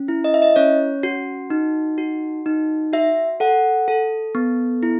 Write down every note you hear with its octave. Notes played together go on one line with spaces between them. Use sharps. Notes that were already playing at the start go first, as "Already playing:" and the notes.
Already playing: C#4
E4
D#5
E5
D#5
C#4 C#5
F#4
D#4
F#4
D#4
F#4 E5
A4 F#5
A4
B3
E4